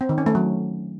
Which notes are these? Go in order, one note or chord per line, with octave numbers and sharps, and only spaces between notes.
C4
D#3
C#4
A3
F#3